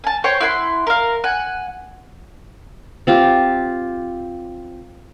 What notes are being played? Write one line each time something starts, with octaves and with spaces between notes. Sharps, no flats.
G#5 A5
C5 C#5 G5 C#6
E4 F#5 G#5 C6
A#4 F5
F#5 G#5
C4 F4 G4